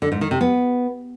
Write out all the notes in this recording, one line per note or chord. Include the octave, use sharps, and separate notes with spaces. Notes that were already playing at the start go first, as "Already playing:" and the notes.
D3
G#2
D#3
C3
B3